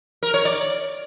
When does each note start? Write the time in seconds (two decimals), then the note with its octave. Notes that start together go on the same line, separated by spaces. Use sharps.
0.23 A#4
0.34 C#5
0.45 D5